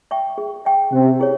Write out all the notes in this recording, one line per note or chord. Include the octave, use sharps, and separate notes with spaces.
E5 G5 C#6
G#4
E5 G5 C#6
C3 C#4
E4 G#4 C#5